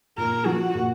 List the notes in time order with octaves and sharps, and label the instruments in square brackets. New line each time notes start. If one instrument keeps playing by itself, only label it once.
[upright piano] A#2 [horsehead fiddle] A#4
[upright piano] F3 [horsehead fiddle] F#4
[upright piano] A#2